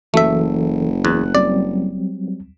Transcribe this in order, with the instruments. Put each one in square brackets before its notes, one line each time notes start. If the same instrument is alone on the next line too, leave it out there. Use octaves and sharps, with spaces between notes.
[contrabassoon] F#1 [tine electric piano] E3 F#4 A4 [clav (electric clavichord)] A3 E5
[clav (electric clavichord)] E2 [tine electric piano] F#6
[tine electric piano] F#3 G3 C4 [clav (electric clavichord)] D5